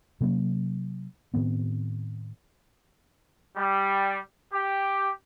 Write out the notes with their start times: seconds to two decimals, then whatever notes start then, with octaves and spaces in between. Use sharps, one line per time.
0.21 C3 F#3 A#3 C#4
1.34 A2 D#3 B3 C4
3.57 G3
4.53 G4